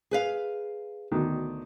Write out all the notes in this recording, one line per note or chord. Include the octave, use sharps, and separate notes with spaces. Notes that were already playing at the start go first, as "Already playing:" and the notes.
G#4 B4 F5
D2 B2 D#3